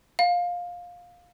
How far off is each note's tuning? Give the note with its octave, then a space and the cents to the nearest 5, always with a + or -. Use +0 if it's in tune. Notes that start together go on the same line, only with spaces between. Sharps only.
F5 +15